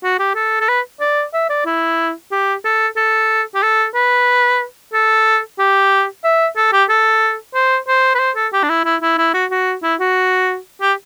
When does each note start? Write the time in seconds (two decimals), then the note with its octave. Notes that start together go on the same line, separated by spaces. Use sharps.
0.03 F#4
0.19 G4
0.35 A4
0.61 A4
0.69 B4
1.00 D5
1.34 E5
1.49 D5
1.66 E4
2.31 G4
2.64 A4
2.97 A4
3.55 G4
3.63 A4
3.95 B4
4.94 A4
5.59 G4
6.24 E5
6.57 A4
6.73 G4
6.89 A4
7.54 C5
7.87 C5
8.15 B4
8.19 C5
8.36 A4
8.53 G4
8.63 D4
8.69 E4
8.85 E4
9.02 E4
9.18 E4
9.34 F#4
9.51 F#4
9.83 E4
10.00 F#4
10.81 G4